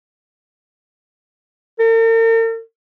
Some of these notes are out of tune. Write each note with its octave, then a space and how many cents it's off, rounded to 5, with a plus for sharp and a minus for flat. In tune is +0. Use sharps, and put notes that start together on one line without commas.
A#4 -45